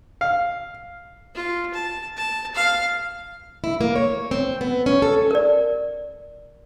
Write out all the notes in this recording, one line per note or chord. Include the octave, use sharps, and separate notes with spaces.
F5
F4
A5
A5
F5
E4
A#3
C#5
C4
B3
C#4
A4
A#4 D5